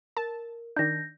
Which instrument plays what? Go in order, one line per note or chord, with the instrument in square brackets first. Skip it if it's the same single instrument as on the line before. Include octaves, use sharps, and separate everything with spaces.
[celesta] A#4 [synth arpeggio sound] A5
[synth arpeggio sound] D#3 D4 [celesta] G6 A#6